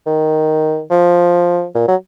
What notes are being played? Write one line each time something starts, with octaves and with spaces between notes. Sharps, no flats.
D#3
F3
A#2
F#3